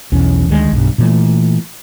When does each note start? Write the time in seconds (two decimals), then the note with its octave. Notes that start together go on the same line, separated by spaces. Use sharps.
0.12 B1 E2 C#4
0.49 D2 D#3 E3 G#3
0.72 B1 G2
0.98 A#2 E3 G#3 A3